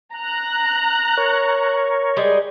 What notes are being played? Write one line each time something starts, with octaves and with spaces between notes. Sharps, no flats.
A#5 F#6
A#4 C#5
G3 G#3 G#4